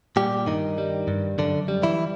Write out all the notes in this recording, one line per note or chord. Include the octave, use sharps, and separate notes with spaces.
A#2 G3 G4
G2 D#3 D#4
G3
G2
F#2 D3 D4
G3
E3 E4